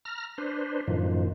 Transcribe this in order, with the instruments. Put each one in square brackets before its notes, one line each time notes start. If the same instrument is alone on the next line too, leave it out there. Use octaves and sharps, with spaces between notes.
[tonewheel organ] A#5 F6
D4 B4 C5
F#2 A2 D#3 F3